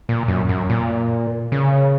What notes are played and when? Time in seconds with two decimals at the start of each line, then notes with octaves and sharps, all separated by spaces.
0.09 A#2
0.28 F#2
0.49 F#2
0.70 A#2
1.52 C#3